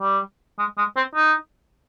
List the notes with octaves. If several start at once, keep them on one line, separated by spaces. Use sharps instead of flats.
G3
G#3
G#3
C4
D#4